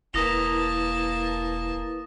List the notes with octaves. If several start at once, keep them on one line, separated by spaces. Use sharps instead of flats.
E1 A#3 E4 B4 A5 D#6 A#6 F7